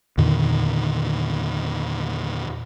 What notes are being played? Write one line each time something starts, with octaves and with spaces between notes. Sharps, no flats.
E2 A#2 D3 D#3